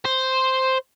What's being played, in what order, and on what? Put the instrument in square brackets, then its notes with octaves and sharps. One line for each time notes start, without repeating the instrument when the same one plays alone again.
[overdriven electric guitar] C5